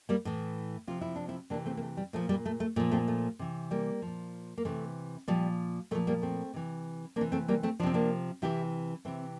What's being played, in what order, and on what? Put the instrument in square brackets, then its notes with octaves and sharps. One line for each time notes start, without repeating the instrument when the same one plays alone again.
[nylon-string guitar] G3 A#3
A2 E3
C3 F3 F4
E4
D4
C4 E4
C3 A#3 D4
E3
A3 C4
A#3
A3
G3
A#2 F3 A3
G3 A#3
A3
A3
A#2 A3
F3
A3 C4
A3
C3 E3
G3 A#3
A#2 F3
A#3
C3 E3 A3
A#2 F3 G3
A#2 A3
F3
G3 A#3
A3 C4
C3 E3
C3 E3 A#3 D4
A3 C4
G3 A#3
A3 C4
F3 D4
C3 C4
A#3 D4
C3 E3 E4 G4
C3 E3 C4 E4